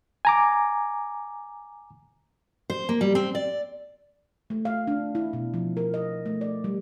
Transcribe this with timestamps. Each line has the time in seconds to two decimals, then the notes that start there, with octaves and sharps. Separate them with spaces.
0.25 G#5 A#5 D6
2.70 C5
2.89 A#3
3.01 G3
3.15 C4
3.35 D5
4.50 A3
4.65 F5
4.87 D4
5.15 E4
5.33 B2
5.54 F3
5.77 A#4
5.94 D#5
6.26 A3
6.41 D5
6.64 G3